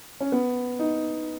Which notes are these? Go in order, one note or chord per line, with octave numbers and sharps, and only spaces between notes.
C#4
B3
D#4